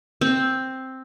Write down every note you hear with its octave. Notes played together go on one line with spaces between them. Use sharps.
C4